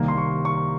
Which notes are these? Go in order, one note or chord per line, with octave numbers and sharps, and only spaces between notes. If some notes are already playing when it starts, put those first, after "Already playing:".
Already playing: C2 C3 D#3 G3 A#3
C6
C#6
C#6